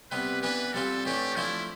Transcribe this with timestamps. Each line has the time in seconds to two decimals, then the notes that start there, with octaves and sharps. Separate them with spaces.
0.11 C3 G3 B3 B4
0.42 E3 B3 D4 B4
0.74 G3 C4 F4 A4
1.05 A2 E3 A3 D4 G4
1.36 F3 A3 D4 E4 F4